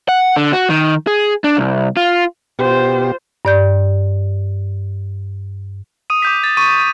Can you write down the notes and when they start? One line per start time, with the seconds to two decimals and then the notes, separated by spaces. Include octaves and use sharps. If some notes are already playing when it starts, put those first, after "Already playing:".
0.09 F#5
0.36 D3
0.53 F#4
0.69 D#3
1.07 G#4
1.44 D4
1.57 C2
1.97 F4
2.59 B2 F4 G4 C5
3.45 G2 D5 G6
6.10 D#6 D#7
6.22 D6 G6 B6
6.44 A6
6.57 C#6 D#7